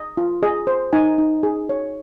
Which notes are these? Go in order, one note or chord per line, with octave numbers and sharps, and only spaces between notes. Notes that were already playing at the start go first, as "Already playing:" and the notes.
Already playing: D#5
F4
G#4 D#5
C5
D#4 G#5
D#4
G#4
C#5